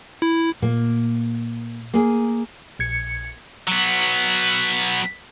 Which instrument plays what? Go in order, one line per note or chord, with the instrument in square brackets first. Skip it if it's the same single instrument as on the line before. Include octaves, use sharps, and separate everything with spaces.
[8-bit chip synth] E4
[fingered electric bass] A#2 [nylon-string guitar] A#3
[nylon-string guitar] A#3 G#4
[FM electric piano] A#1 G#6 C#7
[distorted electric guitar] F#3 B3